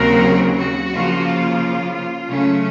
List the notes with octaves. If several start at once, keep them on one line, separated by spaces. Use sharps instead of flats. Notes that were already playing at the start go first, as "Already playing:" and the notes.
Already playing: D#2 C#3 F#3 C4 F#4 A#4
F#4
C#3 F3 A#3 F4
F4
C#3 F#3 A3 C#4